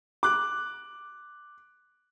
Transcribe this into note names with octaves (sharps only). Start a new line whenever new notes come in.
D6 F#6